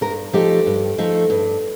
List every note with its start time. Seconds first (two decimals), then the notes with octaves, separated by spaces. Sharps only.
0.01 G2 A#4
0.33 F3 A3 D#4 G4
0.66 G2
0.98 F3 A3 D#4
1.30 G2